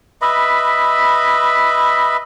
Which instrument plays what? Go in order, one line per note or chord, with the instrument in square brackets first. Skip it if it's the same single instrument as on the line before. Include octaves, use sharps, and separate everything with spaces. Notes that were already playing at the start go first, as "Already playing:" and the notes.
[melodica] B4 D#5 E5 B5